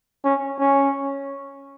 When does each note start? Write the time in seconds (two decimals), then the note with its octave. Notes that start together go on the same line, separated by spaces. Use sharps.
0.24 C#4
0.59 C#4